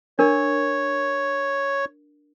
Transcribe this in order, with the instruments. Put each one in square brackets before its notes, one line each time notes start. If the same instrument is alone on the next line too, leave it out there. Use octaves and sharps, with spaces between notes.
[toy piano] D4 A#4 [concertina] C#5